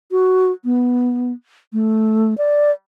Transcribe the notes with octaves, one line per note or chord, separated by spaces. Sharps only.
F#4
B3
A3
D5